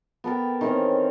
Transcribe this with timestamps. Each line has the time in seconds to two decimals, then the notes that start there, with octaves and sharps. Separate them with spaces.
0.24 B3 A4 A#4 G5
0.61 D#3 E3 C4 C#4